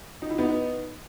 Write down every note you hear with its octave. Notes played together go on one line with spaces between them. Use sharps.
D#4
E4
B3 D#4